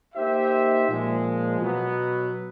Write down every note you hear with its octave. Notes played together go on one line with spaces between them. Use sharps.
A#3 D#4 G4 C5 E5
A#2 F3 G#3
B2 F#3 B3